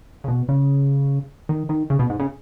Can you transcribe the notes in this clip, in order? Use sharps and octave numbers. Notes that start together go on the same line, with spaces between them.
C#3
B2
C#3
D#3
D#3
C#3
B2
G#2
C#3